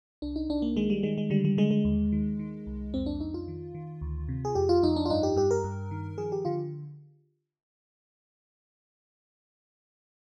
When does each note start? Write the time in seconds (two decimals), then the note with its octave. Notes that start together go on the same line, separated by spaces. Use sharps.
0.22 C2 D4
0.36 D#4
0.49 C2 D4
0.62 A#3
0.77 D#3 G#3
0.90 G3
1.03 D#3 G#3
1.18 G#3
1.30 D3 G3
1.45 G3
1.58 D3 G#3
1.71 G#3
1.85 D#2
2.12 D#3
2.39 D#3
2.67 C2
2.94 F2 C4
3.06 D4
3.20 F2 D#4
3.34 F4
3.48 D#3
3.74 D#3
4.01 D2
4.29 C3
4.45 G#4
4.55 F2 G4
4.69 F4
4.83 F2 D#4
4.96 D4
5.06 F4
5.10 G2 D#4
5.23 G4
5.36 G2 G4
5.51 A#4
5.64 G2
5.91 D#3
6.18 F3 G#4
6.32 G4
6.45 D3 F4